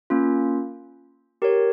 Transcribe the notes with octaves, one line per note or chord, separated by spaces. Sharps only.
A#3 C#4 F4
G4 A#4 C#5